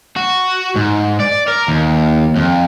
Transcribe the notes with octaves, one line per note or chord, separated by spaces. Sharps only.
F#4
G#2
D5
A#4
D#2
F2